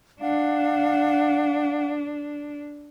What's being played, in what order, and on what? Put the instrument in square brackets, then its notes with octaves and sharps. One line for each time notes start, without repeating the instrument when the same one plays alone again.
[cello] D4 [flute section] F5 F#5